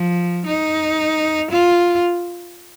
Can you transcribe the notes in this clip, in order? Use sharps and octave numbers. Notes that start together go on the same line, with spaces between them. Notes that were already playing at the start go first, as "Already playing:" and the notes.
Already playing: F3
D#4
F4